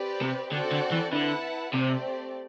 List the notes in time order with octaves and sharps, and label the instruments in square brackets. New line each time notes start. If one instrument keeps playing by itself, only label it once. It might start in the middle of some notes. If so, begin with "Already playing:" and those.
Already playing: [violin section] C4 G4 B4 D5
[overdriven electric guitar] C3
[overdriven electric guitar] D3 [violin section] C4 F#4 A4 D5 G5
[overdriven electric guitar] D3
E3
[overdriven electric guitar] D3 [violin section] E4 B4 F#5 A5
[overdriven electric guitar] C3 [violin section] A3 C4 G4 D5